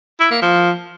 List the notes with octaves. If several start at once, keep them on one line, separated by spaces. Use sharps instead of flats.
E4
A#3
F3